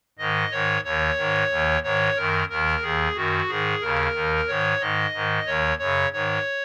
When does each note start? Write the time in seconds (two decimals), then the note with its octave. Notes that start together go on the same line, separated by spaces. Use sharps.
0.19 G#2 D#3 D#5
0.51 G#2 D#3 C#5
0.84 D#2 D#3 C#5
1.18 G#2 D#3
1.50 D#2 D#3
1.83 G#2 D#3 C#5
2.16 F#2 D#3 A#4
2.49 D#2 D#3 A#4
2.82 D#2 D#3 G#4
3.15 F#2 D#3 F#4
3.48 G#2 D#3 G#4
3.81 D#2 C#3 A#4
4.15 D#2 D#3
4.48 G#2 D#3 C#5
4.80 G#2 D#3 D#5
5.13 G#2 D#3
5.46 D#2 D#3 C#5
5.79 F#2 C#3 C#5
6.12 G#2 D#3 C#5